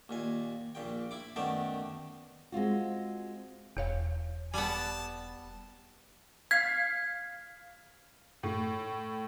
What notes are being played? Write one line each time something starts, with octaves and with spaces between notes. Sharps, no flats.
D#2 A#2 G#5
A#1 A#2 G5
E4 B5 D6
F#2 D#3 A3 B3 D5 G5
G#3 C4 F4 F#4
E1 E2 C#5 F5
G3 B3 A5
F5 G#6 B6 C7
A2